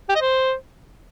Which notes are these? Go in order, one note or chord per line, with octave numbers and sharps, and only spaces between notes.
G4
D#5
C5